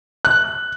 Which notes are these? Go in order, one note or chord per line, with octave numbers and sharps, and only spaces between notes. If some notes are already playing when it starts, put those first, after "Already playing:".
F#6